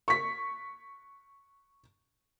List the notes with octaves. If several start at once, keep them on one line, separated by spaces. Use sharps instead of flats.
C#6 B6